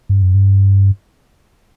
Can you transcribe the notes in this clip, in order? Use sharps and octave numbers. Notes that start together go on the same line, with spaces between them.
G2
F#2
G2